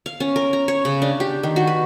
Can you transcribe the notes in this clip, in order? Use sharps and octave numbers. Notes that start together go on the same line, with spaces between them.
F5
C#4
A#4
A#5
C#5
C#3
D4
G4
D#3
F#4
B4